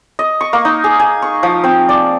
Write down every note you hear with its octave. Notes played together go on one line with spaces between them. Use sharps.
D#5
C#6
A#3
D#4
G#4
G#5
C#6
F3
C4
D5